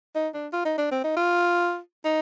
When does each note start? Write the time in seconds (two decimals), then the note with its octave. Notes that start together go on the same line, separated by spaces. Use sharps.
0.15 D#4
0.34 D4
0.53 F4
0.65 D#4
0.78 D4
0.91 C4
1.04 D#4
1.17 F4
2.05 D#4